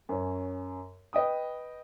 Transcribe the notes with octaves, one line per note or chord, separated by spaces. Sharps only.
F#2 C#4
B4 D#5 G5 D#6